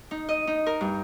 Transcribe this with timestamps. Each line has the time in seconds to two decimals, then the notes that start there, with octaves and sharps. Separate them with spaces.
0.11 D#4
0.29 D#5
0.47 D#4
0.66 A#4
0.81 G2